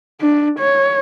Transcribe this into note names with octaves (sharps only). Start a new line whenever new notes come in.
D4
C#5